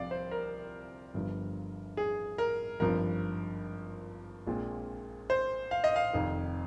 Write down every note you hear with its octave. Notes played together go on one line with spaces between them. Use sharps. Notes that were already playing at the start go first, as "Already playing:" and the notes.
Already playing: C2 C3 F3 D5 F5
C5
A#4
G1 G2 F3
G#4
A#4
G#1 G2 F3 A#4
A#1 A#2 G#3 C4 F4
C5
F5
D#5
F5
F1 F2 D#3